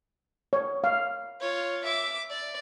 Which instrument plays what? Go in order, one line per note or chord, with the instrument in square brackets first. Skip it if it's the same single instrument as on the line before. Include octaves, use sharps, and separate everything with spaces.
[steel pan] C#5
F5
[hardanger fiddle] F4 C#5
E5 D6
D5